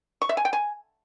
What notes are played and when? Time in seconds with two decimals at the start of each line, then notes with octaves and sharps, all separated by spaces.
0.22 C#6
0.29 E5
0.37 G#5
0.45 G5
0.53 G#5